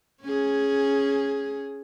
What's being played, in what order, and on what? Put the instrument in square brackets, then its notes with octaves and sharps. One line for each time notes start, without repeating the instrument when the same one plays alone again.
[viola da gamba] C#4 G#4